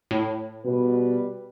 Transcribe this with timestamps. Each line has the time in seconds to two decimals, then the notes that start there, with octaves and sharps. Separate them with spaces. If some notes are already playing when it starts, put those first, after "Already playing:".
0.11 A2
0.65 B2 G3 B4